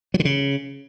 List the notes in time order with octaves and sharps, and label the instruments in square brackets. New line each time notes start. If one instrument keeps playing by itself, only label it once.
[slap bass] F#3
D3
C#3